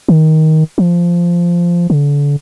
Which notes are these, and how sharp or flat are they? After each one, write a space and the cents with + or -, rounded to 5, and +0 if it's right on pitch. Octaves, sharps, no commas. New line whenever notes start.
D#3 +15
F3 -10
D3 -35